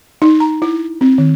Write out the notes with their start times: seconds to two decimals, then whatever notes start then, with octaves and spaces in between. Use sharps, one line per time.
0.22 D#4
0.40 A#5
0.62 E4
1.01 C4
1.18 D#3